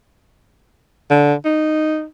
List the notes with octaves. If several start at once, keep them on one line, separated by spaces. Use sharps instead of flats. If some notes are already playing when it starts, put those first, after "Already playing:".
D3
D#4